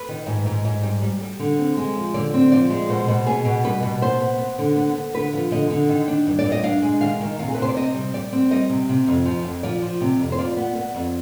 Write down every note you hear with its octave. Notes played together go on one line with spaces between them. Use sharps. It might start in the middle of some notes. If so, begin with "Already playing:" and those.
Already playing: B4
D#3
G#2
G#2
G#2
G3
G3
G3
D3
C4
G#3
F3
D3 D5
C4
F3 D5
G#3
B2 C5
B2
B3 G#4
B2
G3 B4
B2
B3 C5
B3
B3
D3
B3
B3
D3 B4
F3
D3 D#5
D3
D#3
D4
G2
D5
G2
D#5
D4 F5
G#3
D#3 F5
D#3
C3 F5
G#4
B4
C3 C5
D5
C4 D#5
G3
G3 D5
C4
G3 D#5
C3
C3
F2
F3
F2
F3 D5
F3
C3
F2
C5
F4 D5
B3
B3
F2